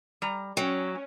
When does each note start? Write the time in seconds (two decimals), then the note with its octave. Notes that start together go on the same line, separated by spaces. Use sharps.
0.22 G3 A#5
0.57 F#3 C#4 G5